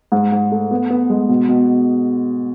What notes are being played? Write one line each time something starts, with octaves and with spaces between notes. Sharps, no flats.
G#2
G#2
A3
B3
B3
G#3
B2
B2